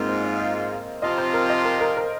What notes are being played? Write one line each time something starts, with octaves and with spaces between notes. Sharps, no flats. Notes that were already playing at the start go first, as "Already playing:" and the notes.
Already playing: G#2 G#3 A#3 C4 F4
C5
D#5
F5
C3 F3 C4 F4 D#5
C5
A#4
D#5
A#4
A#4
A#4